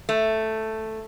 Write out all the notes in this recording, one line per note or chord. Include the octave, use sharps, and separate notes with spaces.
A3